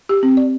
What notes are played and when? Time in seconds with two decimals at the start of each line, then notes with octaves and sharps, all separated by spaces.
0.09 G4
0.23 C4
0.37 D5